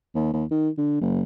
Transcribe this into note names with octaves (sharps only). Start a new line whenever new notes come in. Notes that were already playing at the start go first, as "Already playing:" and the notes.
D#2
D#2
D#3
D3
F#1